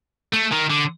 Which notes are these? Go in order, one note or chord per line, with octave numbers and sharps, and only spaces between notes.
A3
D#3
D3